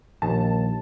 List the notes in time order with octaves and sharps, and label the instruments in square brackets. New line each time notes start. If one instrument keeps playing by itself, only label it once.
[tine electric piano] A#1 [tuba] D#2 [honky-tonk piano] A5